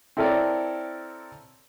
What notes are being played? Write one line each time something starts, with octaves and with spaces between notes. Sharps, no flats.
C4 E4 A4 A#4 C#5 D5